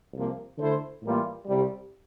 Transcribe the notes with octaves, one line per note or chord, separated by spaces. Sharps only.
C2 C3 F3 A#3
D3 A3 E4 A4 C5
A2 E3 G3 A#3 F4
C2 C3 G3